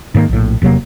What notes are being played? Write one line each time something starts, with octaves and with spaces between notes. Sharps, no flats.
G#2 D#3 A#3
A#1 A2
E1 C3 F#3 A#3